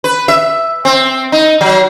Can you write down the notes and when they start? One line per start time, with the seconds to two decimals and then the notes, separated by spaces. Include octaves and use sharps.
0.04 B4
0.28 E5
0.85 C4
1.32 D#4
1.61 F#3